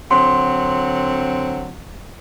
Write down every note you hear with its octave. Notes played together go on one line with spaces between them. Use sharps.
D3 F#3 C4 C6